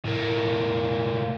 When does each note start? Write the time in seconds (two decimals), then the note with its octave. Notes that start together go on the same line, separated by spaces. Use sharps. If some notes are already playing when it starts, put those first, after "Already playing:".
0.05 A2 A#3